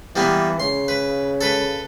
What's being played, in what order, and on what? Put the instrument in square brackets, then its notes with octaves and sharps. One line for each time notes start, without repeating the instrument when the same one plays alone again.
[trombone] E3 [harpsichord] G3 A#3 B3
[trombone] C#3 [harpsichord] C6
[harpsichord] B4
A4 B4